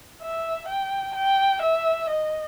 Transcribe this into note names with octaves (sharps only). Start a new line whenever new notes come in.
E5
G5
G5
E5
D#5